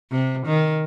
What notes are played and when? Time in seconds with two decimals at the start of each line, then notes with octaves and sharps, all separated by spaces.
0.11 C3
0.46 D#3